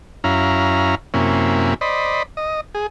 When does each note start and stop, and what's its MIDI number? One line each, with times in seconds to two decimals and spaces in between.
0.24 0.95 42
0.24 0.95 61
0.24 0.95 64
0.24 0.95 77
0.24 0.95 82
1.14 1.74 42
1.14 1.74 48
1.14 1.74 58
1.14 1.74 61
1.14 1.74 64
1.81 2.23 72
1.81 2.23 74
1.81 2.23 75
1.81 2.23 83
2.37 2.61 75
2.75 2.87 68